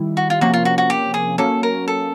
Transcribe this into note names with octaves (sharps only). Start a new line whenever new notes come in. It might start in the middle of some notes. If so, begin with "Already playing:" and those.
Already playing: D#3 G3 E4
F#4
F4
C3 F3 A#3 C#4 F#4
F4
F#4
F#4
G4
G#4
F#3 A#3 C#4 A4
A#4
A4